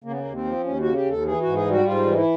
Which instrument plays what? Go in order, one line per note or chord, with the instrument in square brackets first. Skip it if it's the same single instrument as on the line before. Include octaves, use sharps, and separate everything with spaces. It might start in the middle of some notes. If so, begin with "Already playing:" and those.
[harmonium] C#3 A#3
B3
A#3
D#2
C4
F3
D#2 C#4
F#4
C#3
G4
D#2 A4
E3 G#4
G#2 F#4
G#4
G3 F#4
G#2 F4
E3
D#4
E4